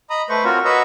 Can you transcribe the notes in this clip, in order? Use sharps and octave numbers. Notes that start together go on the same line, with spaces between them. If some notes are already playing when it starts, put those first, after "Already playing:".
D#5 A#5 B5 D#6
A3 B4 C5 C#6
C4 F4 F#4 A#4 C#5
F#4 B4 C#5 D#5 A#5 E6